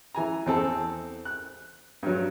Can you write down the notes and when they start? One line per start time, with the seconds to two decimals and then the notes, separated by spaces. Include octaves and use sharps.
0.15 E3 G#5 A#5
0.46 E2 C4 A4 A5
1.25 F#6
2.03 G2 F#3